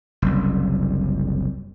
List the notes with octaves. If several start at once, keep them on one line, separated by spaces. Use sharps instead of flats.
F#1 C2